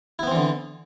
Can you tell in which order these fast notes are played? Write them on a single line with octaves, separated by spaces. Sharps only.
E4 B3 C4 E3 D3